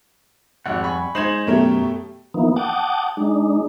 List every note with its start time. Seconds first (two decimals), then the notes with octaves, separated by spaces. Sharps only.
0.66 G#1 F2 G3 F#5
0.84 G#5 B5 C#6
1.15 G#3 D#4 C5 G#6 E7 F#7
1.47 F#2 B2 A3 G4 A#4 C#5
2.34 E3 F3 A#3 B3 D#4
2.56 F#5 G5 A5 D6 D#6
3.17 G#3 D4 D#4